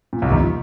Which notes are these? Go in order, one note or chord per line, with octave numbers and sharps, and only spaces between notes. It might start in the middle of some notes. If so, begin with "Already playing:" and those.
A#2
C2 C3
D#2 D#3
F3